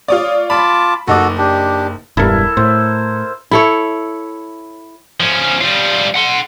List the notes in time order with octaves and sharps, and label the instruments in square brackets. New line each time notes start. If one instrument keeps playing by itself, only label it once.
[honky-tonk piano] F4 C#5 D5 [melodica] D#6
[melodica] F4 A5 D6 [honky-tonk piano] B5
[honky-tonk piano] F#1 D#4 D6 [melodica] F#4 A4
[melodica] D4 G4
[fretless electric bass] E1 G2 [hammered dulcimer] E4 A4 A#4
[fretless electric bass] A2 [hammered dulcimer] C5
[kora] E4 A4 C#5
[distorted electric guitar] F3 C#4
G3 F4
F#5 C6